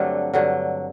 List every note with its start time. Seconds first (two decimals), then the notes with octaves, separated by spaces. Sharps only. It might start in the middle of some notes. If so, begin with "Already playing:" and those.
Already playing: G2 D3 F#3 A3 C4 D4
0.33 G2 D3 F#3